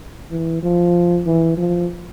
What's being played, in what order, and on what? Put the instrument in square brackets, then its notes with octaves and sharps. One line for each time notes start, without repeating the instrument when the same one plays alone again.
[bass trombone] E3
F3
E3
F3